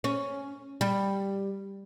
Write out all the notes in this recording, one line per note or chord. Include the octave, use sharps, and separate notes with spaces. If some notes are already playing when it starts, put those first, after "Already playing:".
C#4
G3